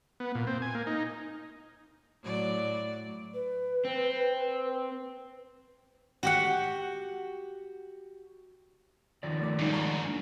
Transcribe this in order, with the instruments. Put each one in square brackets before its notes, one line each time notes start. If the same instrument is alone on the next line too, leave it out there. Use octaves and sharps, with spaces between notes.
[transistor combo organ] B3
A#2
C4
G#5
A#3
D#4
[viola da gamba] A2 F#3 D5
[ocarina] B4
[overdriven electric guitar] C4
[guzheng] F#4 G4 F#5
[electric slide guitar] D#3 F3 D5
[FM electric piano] A3 D6
[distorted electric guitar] G#2 C#3 [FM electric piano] G3 G#3 D#4
[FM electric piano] A5 A#5 C#6
A#3 D4